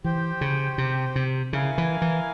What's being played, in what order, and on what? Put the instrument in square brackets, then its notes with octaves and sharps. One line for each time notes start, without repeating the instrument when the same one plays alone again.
[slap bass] E3 [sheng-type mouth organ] G4 C5 G5
[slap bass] C#3
C3
C3
[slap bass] C#3 [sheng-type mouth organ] E4 A#4 F5 G#5
[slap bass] E3
E3